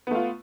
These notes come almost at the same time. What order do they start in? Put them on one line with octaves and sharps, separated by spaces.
B3 A3 F4